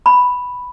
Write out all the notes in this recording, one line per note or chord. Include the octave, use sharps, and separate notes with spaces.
B5